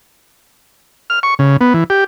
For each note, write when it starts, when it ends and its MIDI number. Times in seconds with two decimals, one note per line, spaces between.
1.10 1.19 89
1.23 1.34 85
1.39 1.57 49
1.61 1.73 59
1.74 1.84 52
1.90 2.04 67